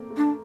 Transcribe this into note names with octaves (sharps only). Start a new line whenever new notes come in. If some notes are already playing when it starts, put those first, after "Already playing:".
Already playing: A3 A#3 C4
A3
D4